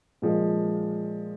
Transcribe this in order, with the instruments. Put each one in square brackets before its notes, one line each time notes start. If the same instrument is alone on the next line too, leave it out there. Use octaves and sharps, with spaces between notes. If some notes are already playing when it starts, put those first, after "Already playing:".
[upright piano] A#2 F3 G#3